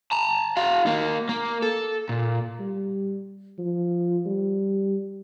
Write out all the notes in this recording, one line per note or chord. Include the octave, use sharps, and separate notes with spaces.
A5 A#5
F#4 F5
A#3 D#4
A#3
A4
A#2
G3
F3
G3